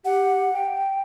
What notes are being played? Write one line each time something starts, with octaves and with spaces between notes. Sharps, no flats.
G4 F#5
G5